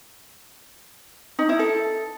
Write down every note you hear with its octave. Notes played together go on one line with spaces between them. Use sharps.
D#4
E4
A4